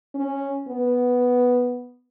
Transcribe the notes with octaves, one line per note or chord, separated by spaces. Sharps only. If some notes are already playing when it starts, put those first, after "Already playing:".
C#4
B3